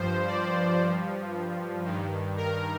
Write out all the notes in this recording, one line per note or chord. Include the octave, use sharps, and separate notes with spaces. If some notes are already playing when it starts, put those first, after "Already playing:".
Already playing: G2 F3 C5
D5
G2 F3
G2 D#3
A#4